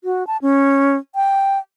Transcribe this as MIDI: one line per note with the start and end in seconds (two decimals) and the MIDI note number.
0.04 0.26 66
0.27 0.37 81
0.42 0.96 61
1.15 1.59 79